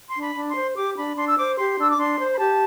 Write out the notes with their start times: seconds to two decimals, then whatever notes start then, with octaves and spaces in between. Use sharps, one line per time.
0.10 C6
0.15 D4
0.21 B5
0.35 D4
0.48 C6
0.56 C5
0.76 G4 D6
0.97 D4 B5
1.17 D4 C6
1.28 E6
1.37 C5 D6
1.57 G4 C6
1.78 D4 E6
1.90 D6
1.98 D4 C6
2.19 C5
2.34 B5
2.39 G4 A5